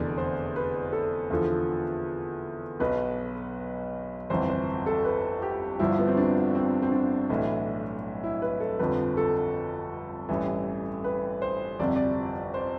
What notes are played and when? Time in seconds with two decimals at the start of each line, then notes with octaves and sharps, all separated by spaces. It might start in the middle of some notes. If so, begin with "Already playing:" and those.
Already playing: F1 E2 D3 D5
0.18 C5
0.56 B4
0.93 A4
1.30 E2 D3 F3
2.80 B1 B2 B4
4.30 G1 F2 E3 C5
4.49 C5
4.86 A4
5.05 B4
5.42 G4
5.79 G1 G2 F3 E4
5.99 B3
6.08 C4
6.17 D4
6.55 C4
6.82 C4
6.92 D4
7.30 B1 A2 E3
8.24 E4
8.42 B4
8.60 A4
8.79 G1 F2 D3 F3 B4
9.17 A4
10.29 A1 G2 E3
11.04 B4
11.42 C5
11.79 G1 F2 C3 D5
11.96 D5
12.54 C5